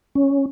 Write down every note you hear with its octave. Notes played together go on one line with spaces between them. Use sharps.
C#4